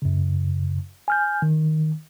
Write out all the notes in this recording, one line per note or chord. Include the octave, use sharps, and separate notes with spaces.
F#2 C#3
G#5 F6 G6
D#3